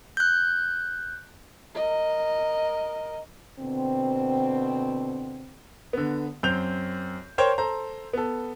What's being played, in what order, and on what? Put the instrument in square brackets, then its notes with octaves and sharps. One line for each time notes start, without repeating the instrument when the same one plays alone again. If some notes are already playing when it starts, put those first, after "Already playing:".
[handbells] F#6 G6
[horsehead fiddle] A#4 D#5
[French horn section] B2 D3 C4
[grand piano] D3 B3
F#2 C4 G6 F7
A#4 C5 C#5 G5
A4 C5 A#5
B3 A4